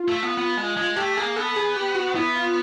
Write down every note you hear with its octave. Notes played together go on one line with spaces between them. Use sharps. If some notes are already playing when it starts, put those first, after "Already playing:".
Already playing: F4
A3
B3
B3
G#3
G#3
A3 G4
A#3 G#4
B3 A4
G#4
G4
F#4
B3 E4
F4